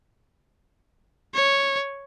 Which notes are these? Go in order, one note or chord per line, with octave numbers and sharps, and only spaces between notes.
C#5